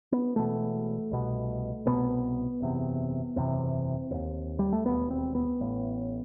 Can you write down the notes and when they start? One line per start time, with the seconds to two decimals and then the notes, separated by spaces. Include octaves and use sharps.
0.12 B3
0.36 E1 E2 B2 A3
1.11 C2 B2
1.85 C2 B2 B3
2.60 F#1 E2 C3
3.36 F#1 E2 C3 C4
4.11 E1
4.14 D#2
4.59 G3
4.73 A3
4.85 E1 D#2 B3
5.11 C4
5.35 B3
5.60 A1 A2